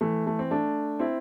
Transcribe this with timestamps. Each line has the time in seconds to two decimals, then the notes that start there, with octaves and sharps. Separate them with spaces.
0.01 E3 A3
0.27 A3
0.39 C4
0.51 A3 D4
0.99 C4 E4